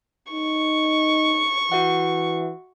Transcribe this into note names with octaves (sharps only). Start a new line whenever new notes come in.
D#4 C#6
E3 F#4 E5 F#5